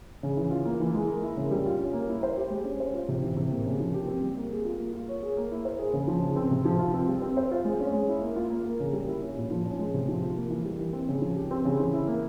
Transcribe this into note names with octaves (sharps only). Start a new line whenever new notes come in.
C#3
E3
F4
A#3
E3
G#3
A#4
E4
C#3
G3
F4
C#4
A#3
E4
C5
G4
G#3
C#4
C5
F4
C3
E3
C3
A#3
C#3
F3
G4
C4
G3
A#3
G#4
F4
A#3
F4
C#5
G#4
A#3
E4
C5
G#4
C#3
F3
C#3
C4
C3
F3
F4
C4
G3
C4
C5
F4
G#3
C#4
G#3
E4
A#3
F4
A#3
A#4
C#3
G3
E4
C#4
A#2
F3
C#4
G#3
C3
F3
F4
A#3
E3
G3
E3
C4
C#3
F3
G4
C4
C#3
E3
E4
A#3